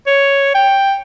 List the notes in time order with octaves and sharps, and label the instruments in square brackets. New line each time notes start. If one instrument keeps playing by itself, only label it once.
[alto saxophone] C#5
G5